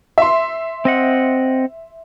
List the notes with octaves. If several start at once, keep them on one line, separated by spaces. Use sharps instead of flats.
E5 C6
C4 D#5 F#5